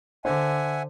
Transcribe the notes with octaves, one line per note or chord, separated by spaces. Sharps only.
D3 C5 E5 F#5 G#5